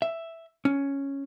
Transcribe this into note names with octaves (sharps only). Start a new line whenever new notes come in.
E5
C#4